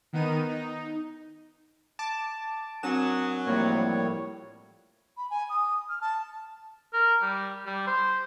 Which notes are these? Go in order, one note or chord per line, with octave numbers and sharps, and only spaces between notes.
D#3 B3 D#4 D#7
D#4
A5 D6
F#3 C4 D4 A#4 G#5 D#6 E7
A2 F3 G3 A#3 C#5
B5
G#5
D#6
F6
A5
A#4
G3
G3
C5